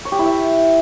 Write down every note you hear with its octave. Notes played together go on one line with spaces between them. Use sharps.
C#5
G4
E4
E5